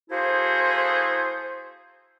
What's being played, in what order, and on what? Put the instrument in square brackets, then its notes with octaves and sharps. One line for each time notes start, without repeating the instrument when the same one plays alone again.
[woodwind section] A#3 E4 F#4 G#4 A4 C5